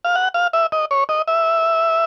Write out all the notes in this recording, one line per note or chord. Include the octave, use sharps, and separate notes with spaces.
F5
F#5
F5
E5
D#5
C#5
D#5
E5